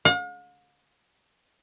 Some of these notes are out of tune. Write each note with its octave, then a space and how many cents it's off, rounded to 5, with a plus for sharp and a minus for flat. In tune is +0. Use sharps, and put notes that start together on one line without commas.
F5 +45